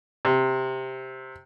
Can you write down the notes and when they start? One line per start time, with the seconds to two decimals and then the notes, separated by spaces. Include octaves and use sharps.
0.25 C3